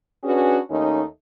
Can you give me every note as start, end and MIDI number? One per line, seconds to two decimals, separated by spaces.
0.24 0.58 61
0.24 0.58 62
0.24 0.58 66
0.24 0.58 68
0.24 0.58 71
0.69 1.02 39
0.69 1.02 57
0.69 1.02 61
0.69 1.02 63